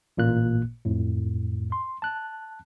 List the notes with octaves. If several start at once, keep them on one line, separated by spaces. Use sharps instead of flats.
A1 A#2 A#3 F#6
F2 A2
C6
A5 F#6